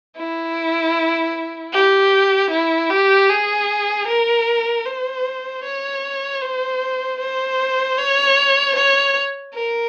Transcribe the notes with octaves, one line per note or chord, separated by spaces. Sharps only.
E4
G4
E4
G4
G#4
A#4
C5
C#5
C5
C5
C#5
C#5
A#4